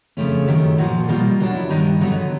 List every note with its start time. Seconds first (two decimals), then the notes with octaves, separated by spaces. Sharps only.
0.17 F2 C#3 F3 A3 C#4
0.48 F#2 D#3 F#3 A3 G4
0.78 A#2 F3 A#3 F#4
1.08 B2 G3 A#3 F4
1.40 B2 F#3 B3 D4
1.55 E4
1.70 G2 D#3 G3 D#4
2.00 D3 F#3 B3 D#4